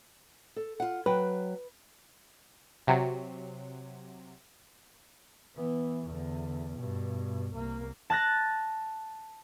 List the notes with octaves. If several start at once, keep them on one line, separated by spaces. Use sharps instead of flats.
A4
F4 F#5
F#3 B4 G5
C3 F#3
E3 B3
E2 D3
G2 B2
C2 A#3
A5 F#6 A6 A#6